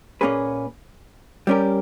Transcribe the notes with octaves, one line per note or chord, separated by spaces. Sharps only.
A#2 A#3 C#4 G#4 B4
G3 C#4 G4 A#4